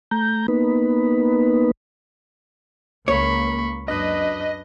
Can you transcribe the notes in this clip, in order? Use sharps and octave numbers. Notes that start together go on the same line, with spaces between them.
A3 A#5 G6
A#3 B3 D#4 B4
C#2 A#3 C#5 B5 C#6
F#2 D4 B4 D#5